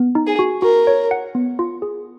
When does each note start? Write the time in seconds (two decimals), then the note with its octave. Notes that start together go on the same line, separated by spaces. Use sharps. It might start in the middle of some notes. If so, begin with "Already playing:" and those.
Already playing: B3
0.15 D#4
0.27 G#4
0.39 F#4
0.62 F#4 A#4
0.87 C#5
1.11 F#5
1.35 B3
1.59 F4
1.82 G#4